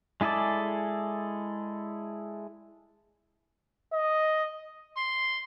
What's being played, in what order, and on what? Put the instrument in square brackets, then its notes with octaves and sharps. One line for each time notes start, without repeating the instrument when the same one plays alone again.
[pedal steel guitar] G#3 E4 G#4 A4 D5
[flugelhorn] D#5
[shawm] C6